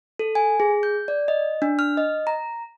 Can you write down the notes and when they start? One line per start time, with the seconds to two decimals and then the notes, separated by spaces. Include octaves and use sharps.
0.19 A4
0.35 G#5
0.60 G#4
0.83 G6
1.08 D5
1.28 D#5
1.62 D4
1.79 F6
1.97 D#5
2.27 A#5